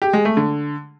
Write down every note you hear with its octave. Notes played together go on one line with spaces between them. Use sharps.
G4
G#3
A3
D3